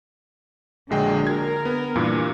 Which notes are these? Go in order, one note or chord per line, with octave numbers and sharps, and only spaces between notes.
A#1 D3 F#3 G#3 G5
A#4 G#6
B3
G2 A#2 E3